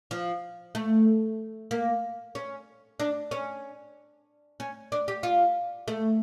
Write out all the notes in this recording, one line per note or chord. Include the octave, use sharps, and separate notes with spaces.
F3
A3
A#3
C#4
D4
C#4
C#4
D4
G4
F4
A3